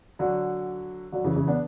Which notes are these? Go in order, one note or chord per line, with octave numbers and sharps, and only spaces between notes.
D3 F#3
D3 F#3
C#3 E3
C#3 E3
B3 D4